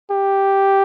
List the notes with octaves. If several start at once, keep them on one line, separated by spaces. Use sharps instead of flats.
G4